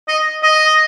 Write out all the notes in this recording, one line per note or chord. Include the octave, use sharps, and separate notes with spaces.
D#5
D#5